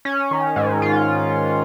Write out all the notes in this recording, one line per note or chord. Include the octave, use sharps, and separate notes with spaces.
C#4
D#3
G#2
F4